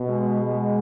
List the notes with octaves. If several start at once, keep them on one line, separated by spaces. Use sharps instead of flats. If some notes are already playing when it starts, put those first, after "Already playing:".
Already playing: B2
G#3
G#3